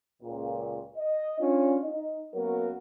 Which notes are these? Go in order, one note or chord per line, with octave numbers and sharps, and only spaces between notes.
C#2 A#2
D#5
C#4 D4 F4
D#4 D#5
F#2 F#3 A#3 B3 F#4 A#4